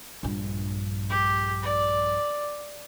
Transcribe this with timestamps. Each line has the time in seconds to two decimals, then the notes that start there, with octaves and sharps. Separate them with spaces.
0.23 A#1 G2
1.10 G4
1.63 D5